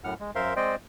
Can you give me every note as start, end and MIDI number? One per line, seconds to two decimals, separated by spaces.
0.04 0.14 42
0.04 0.14 45
0.04 0.14 78
0.04 0.14 89
0.20 0.31 56
0.35 0.54 42
0.35 0.54 70
0.35 0.54 72
0.35 0.54 76
0.35 0.54 77
0.35 0.54 84
0.56 0.75 56
0.56 0.75 60
0.56 0.75 72
0.56 0.75 74
0.56 0.75 75
0.56 0.75 79